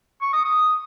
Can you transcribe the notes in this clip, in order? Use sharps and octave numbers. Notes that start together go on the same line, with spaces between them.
C#6
D#6
D#6